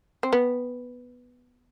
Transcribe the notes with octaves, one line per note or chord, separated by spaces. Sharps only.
C4
B3